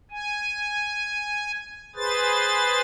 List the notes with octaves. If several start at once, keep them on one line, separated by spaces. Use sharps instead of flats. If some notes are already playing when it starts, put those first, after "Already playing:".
G#5
G#4 B4 C5 A6